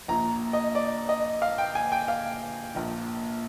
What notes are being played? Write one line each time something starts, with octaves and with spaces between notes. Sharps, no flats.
A#1 A#2 A#5
D#5
D5
D#5
F5
G5
G#5
G5
F5
A#1 A#2